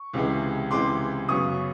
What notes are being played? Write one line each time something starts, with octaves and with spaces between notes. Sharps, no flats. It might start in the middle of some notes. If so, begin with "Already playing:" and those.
Already playing: C#6
C#2 C3 E3 G#3
C#2 C3 E3 G#3 C6 D6
F#2 C#3 F#3 B3 C#6 D#6